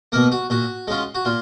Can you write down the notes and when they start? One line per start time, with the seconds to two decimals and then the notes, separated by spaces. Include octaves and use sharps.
0.12 B2 A#3 A#4
0.32 F#4
0.50 A#2 F#4
0.88 G#3 C#4 F4
1.15 F#4
1.25 A#2 F4